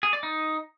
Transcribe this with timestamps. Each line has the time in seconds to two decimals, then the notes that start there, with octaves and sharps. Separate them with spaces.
0.03 G#4
0.13 D5
0.23 D#4